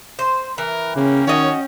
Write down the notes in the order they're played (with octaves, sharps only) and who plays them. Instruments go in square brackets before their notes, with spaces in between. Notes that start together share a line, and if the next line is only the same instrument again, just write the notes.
[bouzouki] C5
[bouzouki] E3 [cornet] A#4
[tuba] C#3 [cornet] A#3 [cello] C#4 G5
[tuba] D#3 [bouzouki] F#4 D#5 [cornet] C#5